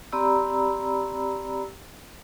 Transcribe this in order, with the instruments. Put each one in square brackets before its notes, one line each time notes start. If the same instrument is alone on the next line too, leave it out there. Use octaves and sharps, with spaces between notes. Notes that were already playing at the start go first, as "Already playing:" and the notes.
[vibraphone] C4 G4 D5 A#5 B5 E6